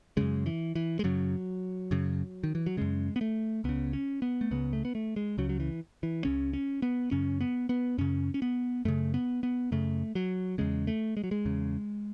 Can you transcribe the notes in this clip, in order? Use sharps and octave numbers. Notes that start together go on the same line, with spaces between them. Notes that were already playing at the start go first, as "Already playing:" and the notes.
F#2 C#3 G#3
E3
E3
G#3
F#2 C#3 F#3
F#2 C#3
D#3
E3
F#3
F#2 C#3 G#3
B3
A3
C#2 C#3 B3
C#4
B3
A3
C#2 C#3 B3
A3
B3
A3
G#3
C#2 C#3 F#3
F#3
E3
E3
C#2 C#3 C#4
C#4
B3
F#2 C#3 C#4
B3
B3
F#2 C#3 C#4
C#4
B3
F#2 C#3 A3
B3
B3
F#2 C#3 A3
F#3
E2 C#3 G#3
A3
G#3
F#3
G#3
E2 C#3